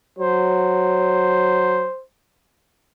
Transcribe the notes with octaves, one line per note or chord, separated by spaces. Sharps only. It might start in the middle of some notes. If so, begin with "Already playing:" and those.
F#3 C5